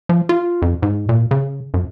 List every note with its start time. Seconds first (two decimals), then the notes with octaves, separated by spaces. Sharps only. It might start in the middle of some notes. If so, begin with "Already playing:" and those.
0.09 F3
0.29 F4
0.62 F2
0.82 G#2
1.09 A#2
1.31 C#3
1.74 F#2